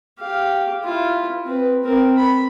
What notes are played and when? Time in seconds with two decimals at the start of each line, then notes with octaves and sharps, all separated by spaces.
0.19 G4 F5
0.84 E4 F4
1.45 C4 B4
1.83 C4 A#4
2.17 B5